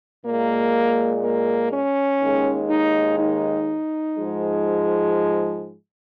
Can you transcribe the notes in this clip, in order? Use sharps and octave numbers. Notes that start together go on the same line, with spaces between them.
A#2 G#3 A#3
A#3
C#4
D#2 D#3 G#3
D#4
D#4
G#2 F3 G#3